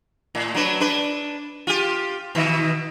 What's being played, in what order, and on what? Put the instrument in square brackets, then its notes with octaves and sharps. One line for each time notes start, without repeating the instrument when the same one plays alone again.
[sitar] A2
F#3 D4 B4
D4 B4
F4 G4
B2 D#3